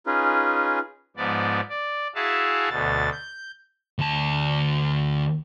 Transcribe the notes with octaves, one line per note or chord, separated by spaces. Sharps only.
C#4 D#4 F4 G#4 B4
G#2 F3 B3 D5
D5
E4 F#4 G#4 E5 F5 A5
D2 B2 A6
G6
D2 A5